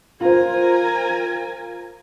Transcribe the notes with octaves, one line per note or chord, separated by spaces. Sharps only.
F4 A#4 C5 G#5